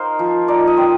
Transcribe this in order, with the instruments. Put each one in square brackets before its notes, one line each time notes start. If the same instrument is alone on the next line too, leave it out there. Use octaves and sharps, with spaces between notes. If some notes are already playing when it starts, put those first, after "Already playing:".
Already playing: [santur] D#4 A#4 C5 F5
F3
D#4 D5
D#5
C4